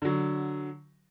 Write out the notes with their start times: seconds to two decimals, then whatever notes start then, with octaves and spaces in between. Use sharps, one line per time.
0.02 D3 F#3